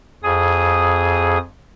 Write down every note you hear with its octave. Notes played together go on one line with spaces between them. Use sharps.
F2 G#4 D#6